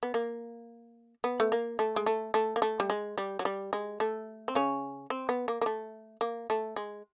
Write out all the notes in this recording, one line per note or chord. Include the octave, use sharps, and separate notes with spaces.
B3
A#3
B3
A3
A#3
A3
G#3
A3
A3
A#3
A3
G3
G#3
G3
F#3
G3
G#3
A3
C4
C#3 C#4
C4
B3
A#3
A#3
A3
A#3
A3
G#3